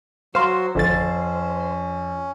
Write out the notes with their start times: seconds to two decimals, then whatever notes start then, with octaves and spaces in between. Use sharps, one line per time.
0.35 F#3 F#4 C5 F5 C6
0.75 G#1 F2 D3 C#4 A6